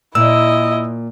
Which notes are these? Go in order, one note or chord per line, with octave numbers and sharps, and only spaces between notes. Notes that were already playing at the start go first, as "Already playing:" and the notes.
A#2 E4 D#5 E6